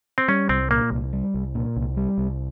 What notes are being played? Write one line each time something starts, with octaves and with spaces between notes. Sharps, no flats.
C4
G3 C#4
C2 C4
A#2 A#3
C2
G3
C2
A#2
C2
G3
C2